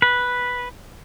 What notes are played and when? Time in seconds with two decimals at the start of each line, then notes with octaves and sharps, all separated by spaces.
0.02 B4